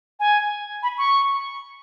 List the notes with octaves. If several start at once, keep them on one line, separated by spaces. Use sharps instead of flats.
G#5
B5
C#6